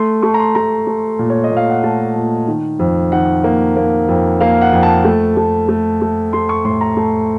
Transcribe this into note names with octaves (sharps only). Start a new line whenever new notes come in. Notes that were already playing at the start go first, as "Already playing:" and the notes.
Already playing: A3 C6
A3 C#6
A#5
C6
A3 A#5
A3
A#2
C#5
D#5
A#2
F5
F#5
A3 A5
A#2
D#3
F2
D#3 F#5
A#3
A#3
F2
A#3 F5
F#5
F2
A5
A3
A3
A3
A3
A3 C6
C#6
A2 C6
A#5
A3